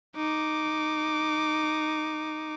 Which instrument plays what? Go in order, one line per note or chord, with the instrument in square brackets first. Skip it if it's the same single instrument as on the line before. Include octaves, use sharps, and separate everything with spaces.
[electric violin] D#4 D6